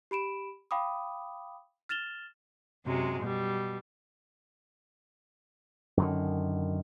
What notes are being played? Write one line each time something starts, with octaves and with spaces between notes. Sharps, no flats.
G4 B5 D7 E7
F5 G5 B5 D6 D#6
F6 A6 E7 F7 G7
F#2 C3 F#3 G#3
B2 G3
F#2 D3 D#3